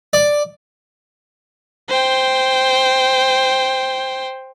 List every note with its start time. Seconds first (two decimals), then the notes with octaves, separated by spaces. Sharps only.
0.13 D5
1.89 C5 G5